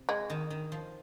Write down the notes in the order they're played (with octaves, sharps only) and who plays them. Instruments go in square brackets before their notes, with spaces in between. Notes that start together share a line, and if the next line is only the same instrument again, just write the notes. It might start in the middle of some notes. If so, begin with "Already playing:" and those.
Already playing: [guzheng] C3
[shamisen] G#3
[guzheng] D#3
D#3
F3